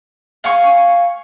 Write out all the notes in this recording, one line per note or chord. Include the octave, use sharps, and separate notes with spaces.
F5 G#5 C#6